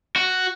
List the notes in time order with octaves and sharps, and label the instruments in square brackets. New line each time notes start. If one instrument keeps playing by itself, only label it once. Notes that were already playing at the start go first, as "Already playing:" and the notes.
[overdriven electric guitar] F#4